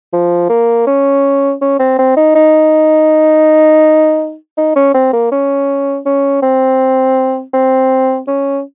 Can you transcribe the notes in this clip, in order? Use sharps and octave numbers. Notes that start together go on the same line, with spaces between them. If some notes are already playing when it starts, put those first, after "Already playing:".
F3
A#3
C#4
C#4
C4
C4
D#4
D#4
D#4
C#4
C4
A#3
C#4
C#4
C4
C4
C#4